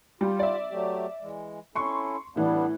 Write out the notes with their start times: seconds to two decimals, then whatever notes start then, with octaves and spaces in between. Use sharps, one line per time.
0.21 G3 F4 G4
0.39 D5 E5
0.71 F#3 A3 G4
1.21 E3 G#3
1.75 C#4 E4 A4 C6 C#6
2.36 A2 E3 G3 B3 D4